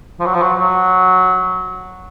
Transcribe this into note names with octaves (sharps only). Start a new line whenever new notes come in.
F3
F#3
F3
F#3
F#3